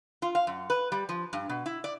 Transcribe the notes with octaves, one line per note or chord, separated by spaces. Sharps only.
F4
F5
F#2
B4
G3
F3
G2
B2
E4
D5